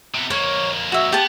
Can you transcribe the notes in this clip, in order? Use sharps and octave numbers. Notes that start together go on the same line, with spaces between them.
C3 B3
F2 A#3 C#5
F#4 E5
B3 G4 A5